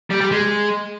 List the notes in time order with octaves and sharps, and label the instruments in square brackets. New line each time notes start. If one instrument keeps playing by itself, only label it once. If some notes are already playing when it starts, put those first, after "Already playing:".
[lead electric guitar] G3
G3
G#3